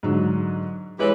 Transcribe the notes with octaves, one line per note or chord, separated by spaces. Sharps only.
G#2 D3 F#3
E3 G#3 E4 G4 B4 C#5